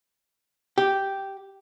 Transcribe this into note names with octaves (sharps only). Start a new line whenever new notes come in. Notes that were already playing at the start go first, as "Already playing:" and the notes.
G4